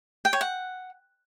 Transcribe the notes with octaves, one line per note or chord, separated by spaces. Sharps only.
G5
C#5
F#5